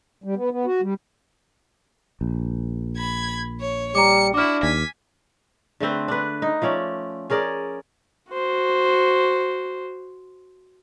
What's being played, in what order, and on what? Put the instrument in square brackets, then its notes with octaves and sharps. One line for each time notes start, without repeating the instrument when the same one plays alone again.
[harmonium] G3
B3
B3
F#4
G3
[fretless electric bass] A#1
[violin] B5 G#6
C#5
[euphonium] G3 [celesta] A#5 D6 [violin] C#7
[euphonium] D4 [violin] E4 F#4 [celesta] D6 F6
[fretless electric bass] D#2 [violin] G#5 B6
[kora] D3 A3 C4 B4
D4 B4
D#4
F3 A3 C#4 D5
C#4 G#4 A#4 D5
[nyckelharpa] F#4 C5